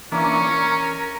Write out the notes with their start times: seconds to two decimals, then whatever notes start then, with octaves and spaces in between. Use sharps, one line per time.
0.12 E3 A#3 C#4 D4 A#5 C#6
0.46 A#4